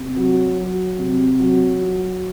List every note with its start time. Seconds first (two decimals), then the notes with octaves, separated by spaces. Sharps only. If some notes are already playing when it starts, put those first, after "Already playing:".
Already playing: C3
0.16 F#3
0.57 F#3
0.99 C3
1.39 F#3
1.81 F#3